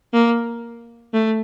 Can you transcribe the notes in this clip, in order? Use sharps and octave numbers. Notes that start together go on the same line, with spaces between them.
A#3
A3